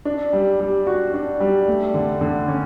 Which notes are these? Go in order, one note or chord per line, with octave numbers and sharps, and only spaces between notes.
D4
G3
G3
F#4
D4
G3
A3
D3
D3
C#4